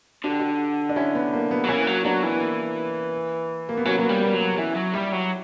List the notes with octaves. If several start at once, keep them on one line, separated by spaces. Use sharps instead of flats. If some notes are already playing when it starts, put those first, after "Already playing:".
D3 F#4
G4
D4 F#4
D4
C#4 E4
B3
A#3
B3
F#3
E3 A#3 C#4
F#3
F#3 B3 D4
E3
B3
A#3
A#3
B3
F#3 A#3 C#4
F#3 A#3 B3
G3
A#3
F#3
B3
E3 C#4 E4
F#3
G3 E4 G4
F#3